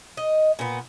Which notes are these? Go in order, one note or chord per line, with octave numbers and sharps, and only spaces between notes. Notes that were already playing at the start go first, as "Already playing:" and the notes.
D#5
A#2 B3